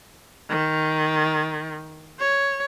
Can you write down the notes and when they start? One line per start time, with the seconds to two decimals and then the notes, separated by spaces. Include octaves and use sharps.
0.50 D#3
2.20 C#5